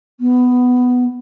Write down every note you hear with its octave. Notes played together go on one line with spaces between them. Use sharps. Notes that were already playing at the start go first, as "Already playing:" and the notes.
B3